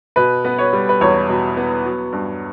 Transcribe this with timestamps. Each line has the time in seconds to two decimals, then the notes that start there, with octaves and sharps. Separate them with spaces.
0.16 B2 B4
0.45 B3
0.58 C#5
0.73 G3
0.89 B4
1.01 E2 C#5
1.29 B2
1.57 B3
1.85 F#3
2.13 G2